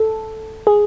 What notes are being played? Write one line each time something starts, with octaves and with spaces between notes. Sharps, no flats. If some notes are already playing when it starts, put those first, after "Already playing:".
Already playing: A4
G#4